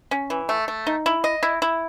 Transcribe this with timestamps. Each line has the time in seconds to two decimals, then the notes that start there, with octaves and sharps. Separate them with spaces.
0.11 C#4
0.30 E3
0.49 A3
0.68 A3
0.87 D#4
1.06 E4
1.24 D#5
1.43 E4
1.62 E4